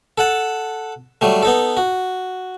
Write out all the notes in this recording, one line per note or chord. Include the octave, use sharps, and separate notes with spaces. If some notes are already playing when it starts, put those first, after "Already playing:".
A4 F#5 A5
F#3 G3 A3
B3 D#4 A4
F#4